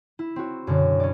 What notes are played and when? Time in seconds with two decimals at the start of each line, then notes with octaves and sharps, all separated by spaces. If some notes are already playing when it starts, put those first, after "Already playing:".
0.19 E4
0.36 C4 F#4
0.67 F#2 B2 D3
1.00 C#4 D5